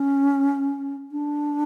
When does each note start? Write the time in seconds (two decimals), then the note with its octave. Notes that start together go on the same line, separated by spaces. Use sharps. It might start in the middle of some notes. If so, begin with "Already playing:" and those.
Already playing: C#4
1.11 D4